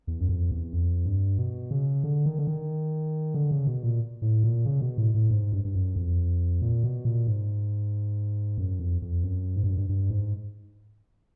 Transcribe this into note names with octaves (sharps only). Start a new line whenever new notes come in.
E2
F#2
F2
E2
F2
G2
B2
C#3
D3
D#3
D3
D#3
D3
C#3
B2
A#2
A2
A#2
C#3
B2
A2
A2
G#2
G2
G2
F#2
F2
A#2
B2
A#2
G#2
F#2
F2
F2
F#2
G#2
G2
F#2
G2
G2
G#2